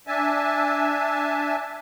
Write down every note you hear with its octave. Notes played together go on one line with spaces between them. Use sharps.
D4 E5 G#5 A5